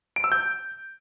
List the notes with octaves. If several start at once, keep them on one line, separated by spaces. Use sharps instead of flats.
D7
E6
G6